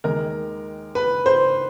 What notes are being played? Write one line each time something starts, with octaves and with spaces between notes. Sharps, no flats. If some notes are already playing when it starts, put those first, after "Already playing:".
D#2 D#3 G#3 A#4
B4
C5